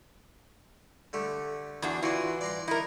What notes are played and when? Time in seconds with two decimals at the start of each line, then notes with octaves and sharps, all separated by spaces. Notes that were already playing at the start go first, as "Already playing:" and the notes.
1.13 D3 A3 G4
1.82 E2 D4 F#4
2.03 E3 F4 F#4 D5
2.41 D5 A#5 C6
2.68 D#4 E4 A#4